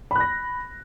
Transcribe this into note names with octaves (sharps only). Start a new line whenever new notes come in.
B5 F#6 A#6